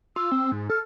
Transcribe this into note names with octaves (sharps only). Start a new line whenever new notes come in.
F4 E6
C4
G#2
A4 F6